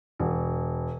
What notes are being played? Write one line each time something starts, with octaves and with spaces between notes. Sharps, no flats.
E1